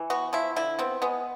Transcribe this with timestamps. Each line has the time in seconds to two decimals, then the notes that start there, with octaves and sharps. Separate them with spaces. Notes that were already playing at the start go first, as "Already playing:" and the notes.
Already playing: E3
0.10 B3 F#4
0.33 F3 E4
0.56 D3 E4
0.79 B3 C4
1.02 G#3 B3